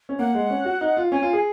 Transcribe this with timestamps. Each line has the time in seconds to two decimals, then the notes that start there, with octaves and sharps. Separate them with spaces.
0.09 C#4
0.19 A#3 F#5
0.35 G#3
0.50 C#4
0.65 F#4
0.81 D#4
0.97 F4
1.11 C#4 G#5
1.22 F4
1.33 G#4